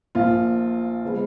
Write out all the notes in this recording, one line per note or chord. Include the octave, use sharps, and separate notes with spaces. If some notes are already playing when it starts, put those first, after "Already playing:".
A#1 A#2 F3 A#3 F4
F3 G#3 B3